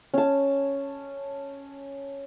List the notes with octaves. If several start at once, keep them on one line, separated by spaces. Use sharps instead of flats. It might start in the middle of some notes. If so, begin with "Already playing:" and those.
C#4 A5